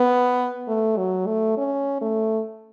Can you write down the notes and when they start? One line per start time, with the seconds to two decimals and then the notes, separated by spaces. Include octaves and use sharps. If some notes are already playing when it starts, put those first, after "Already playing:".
Already playing: B3
0.68 A3
0.97 F#3
1.27 A3
1.57 C#4
2.01 A3